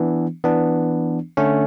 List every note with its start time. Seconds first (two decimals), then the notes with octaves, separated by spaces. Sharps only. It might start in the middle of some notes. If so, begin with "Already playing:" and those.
Already playing: E3 B3 D4
0.44 E3 B3 D4
1.37 D3 A3 C#4